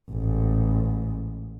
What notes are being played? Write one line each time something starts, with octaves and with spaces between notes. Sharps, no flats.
A1 G#2